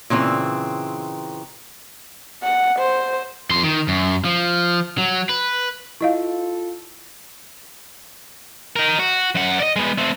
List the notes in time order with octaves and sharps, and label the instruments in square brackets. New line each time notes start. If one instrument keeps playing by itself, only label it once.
[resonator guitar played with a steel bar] A#2 C#3 E3 C4
[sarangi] F#5
C5
[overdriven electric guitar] F2 C6
D#3
F#2
F3
F#3
B4
[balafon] E4 D#5 F5 [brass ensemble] F4 A4
[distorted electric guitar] D#4 A#4
F#4
F#2 F#5
D5 D#5
G#3 B3
A3 C4